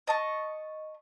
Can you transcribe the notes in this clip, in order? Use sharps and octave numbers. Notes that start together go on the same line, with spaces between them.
D#5 A5 C#6